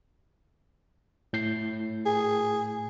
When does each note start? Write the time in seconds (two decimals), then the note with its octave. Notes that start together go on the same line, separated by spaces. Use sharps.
1.33 A2 G6 C7
2.06 G#4